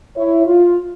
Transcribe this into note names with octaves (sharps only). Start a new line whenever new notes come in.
E4 C#5
F4